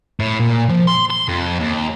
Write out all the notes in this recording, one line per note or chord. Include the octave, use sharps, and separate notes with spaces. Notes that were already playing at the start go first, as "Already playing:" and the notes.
A2
A#2
F3
C6
C6
F2
D#2